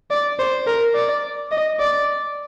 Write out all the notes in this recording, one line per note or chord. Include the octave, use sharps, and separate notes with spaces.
D5
C5
A#4
D5
D#5
D5